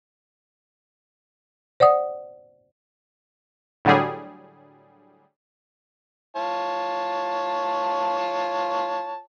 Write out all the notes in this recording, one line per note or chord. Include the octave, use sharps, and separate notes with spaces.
C5 D5 F#5 D#6
A2 D3 F#3 G3 G#4
F4 C#5 A5